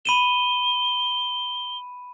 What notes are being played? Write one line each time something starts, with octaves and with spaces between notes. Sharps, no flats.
B5 D#7 E7 G7